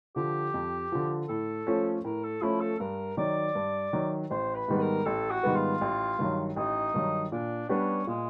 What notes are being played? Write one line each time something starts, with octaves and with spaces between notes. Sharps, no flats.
D3 F3 G4
F2
D3 F3
A2 A4
F3 A3 C#4
A2 A#4
A4
F3 A3 C#4 E4
A4
G2 A#4
D#3 F#3 D5
G2
D#3 F#3
A1 C5
B4
G#2 D#3 G3 B3
A#4
A1 A4
F#4
G#2 D#3 G3 B3
F4
A1
G2 D#3 F#3
A1 D#4
G2 D#3 F#3
A#2 D4
G3 B3 C#4 D4 G4
A#2 G#3